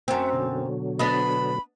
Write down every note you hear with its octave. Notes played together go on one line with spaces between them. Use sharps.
F#2 C4 E5 F#5
B2 D3 F#3
B3 D4 D#5 B5